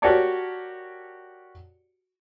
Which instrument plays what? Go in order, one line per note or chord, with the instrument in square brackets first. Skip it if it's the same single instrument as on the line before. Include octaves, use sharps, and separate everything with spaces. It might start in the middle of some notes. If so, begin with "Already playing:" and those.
[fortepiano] F#4 G4 A#4 C#5 D5 A5